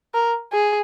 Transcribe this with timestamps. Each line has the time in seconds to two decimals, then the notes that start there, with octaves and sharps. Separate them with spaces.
0.14 A#4
0.53 G#4